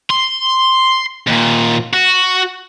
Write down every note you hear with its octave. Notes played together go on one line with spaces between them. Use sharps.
C6
D#2 A#2
F#4